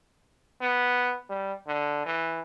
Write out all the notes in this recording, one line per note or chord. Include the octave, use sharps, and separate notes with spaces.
B3
G3
D3
E3